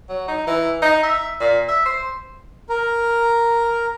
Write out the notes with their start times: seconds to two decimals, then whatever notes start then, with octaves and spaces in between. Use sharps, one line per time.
0.09 F#3
0.28 D#4
0.47 E3
0.82 D#4
1.03 E5
1.40 A#2
1.69 E5
1.86 C5
2.69 A#4